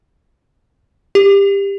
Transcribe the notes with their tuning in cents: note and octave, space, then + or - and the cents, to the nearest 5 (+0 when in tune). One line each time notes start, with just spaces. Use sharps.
G4 +20